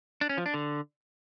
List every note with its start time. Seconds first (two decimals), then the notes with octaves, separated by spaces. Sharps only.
0.21 D4
0.29 C#4
0.38 F3
0.46 D4
0.54 D3